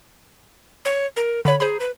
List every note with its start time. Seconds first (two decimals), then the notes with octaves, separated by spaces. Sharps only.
0.85 C#5
1.16 A#4
1.45 D3 C#5 B5
1.60 G#4 C5 A#5 B5
1.80 B4